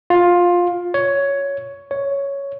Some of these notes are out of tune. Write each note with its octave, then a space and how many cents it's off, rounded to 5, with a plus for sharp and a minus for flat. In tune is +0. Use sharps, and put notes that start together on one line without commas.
F4 +15
C#5 +10
C#5 +5